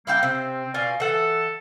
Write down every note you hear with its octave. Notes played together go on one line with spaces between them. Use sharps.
G3 A#3 E4 F5 G5
C3 C4
B2 F4 D5 F5 G#5
E3 A4 F#5